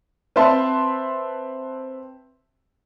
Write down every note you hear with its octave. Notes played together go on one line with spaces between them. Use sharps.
C4 B4 E5 A5 C6